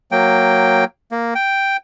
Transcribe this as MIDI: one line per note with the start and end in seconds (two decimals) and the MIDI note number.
0.12 0.84 54
0.12 0.84 58
0.12 0.84 79
1.12 1.34 58
1.35 1.77 79